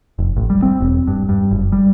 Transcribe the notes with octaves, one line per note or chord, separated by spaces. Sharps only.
F1
A1
G3
C4
E1
G2
G2
F#1
G3